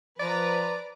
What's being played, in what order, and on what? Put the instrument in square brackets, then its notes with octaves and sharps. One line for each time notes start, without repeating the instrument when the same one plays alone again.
[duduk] F3 [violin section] B4 A#5 [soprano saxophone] D5